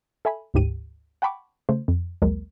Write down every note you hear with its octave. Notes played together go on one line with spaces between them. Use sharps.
A4 E5 G#5 B5
G1 D2 G#2 G4 D#7
F#5 G5 A5 B5 C#6 D6
C#3 A3 C5
F2
A#1 D#2 F#3 G#3 A#3 A#4